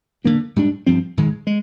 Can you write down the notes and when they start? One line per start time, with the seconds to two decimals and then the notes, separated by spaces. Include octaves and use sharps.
0.24 D3 F3 A#3 D4
0.56 G#2 G3 D4
0.87 G2 F3 C4
1.17 G#2 D#3 G#3
1.47 G#3